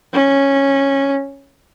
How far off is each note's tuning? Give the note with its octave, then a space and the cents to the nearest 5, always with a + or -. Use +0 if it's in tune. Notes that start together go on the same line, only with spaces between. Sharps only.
C#4 -10